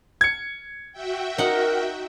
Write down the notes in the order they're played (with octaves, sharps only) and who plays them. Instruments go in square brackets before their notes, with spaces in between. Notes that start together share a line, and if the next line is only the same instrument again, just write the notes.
[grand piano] G#6 C#7
[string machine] F#4 E5 G5
[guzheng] D#4 F#5 [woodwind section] A#4